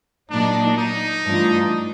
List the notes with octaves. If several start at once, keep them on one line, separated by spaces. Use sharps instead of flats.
A#2 F#3 A#3 D4 D#4
D#4
G2 E3 A3 D4 F4